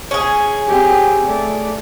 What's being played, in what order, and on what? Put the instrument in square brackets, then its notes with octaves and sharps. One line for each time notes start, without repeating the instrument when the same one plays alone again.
[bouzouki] C#4 G#4
[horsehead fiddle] C4 G4
A3 D5